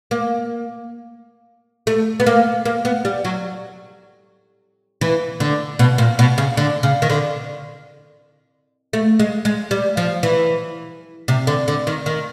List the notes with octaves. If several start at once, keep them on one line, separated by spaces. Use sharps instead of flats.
A#3
A3
B3
A#3
A#3
B3
G3
F#3
E3
D3
B2
A#2
B2
C#3
D3
C#3
D#3
D3
A3
G#3
G#3
G3
F3
E3
C3
D3
D3
D#3
D#3